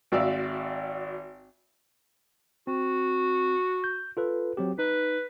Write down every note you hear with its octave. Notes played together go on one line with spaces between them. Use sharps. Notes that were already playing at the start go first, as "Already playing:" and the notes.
G#1 F#4 D5 E5 F5 E6
C4 F#4
G6
F4 A4 B4
F#3 C4 G4
D#4 B4